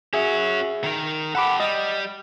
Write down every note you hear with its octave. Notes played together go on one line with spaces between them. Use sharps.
C#4 F#4 G#4 E5
D#3 A#4
G4 A4 F#5 B5 D6
G3 D#5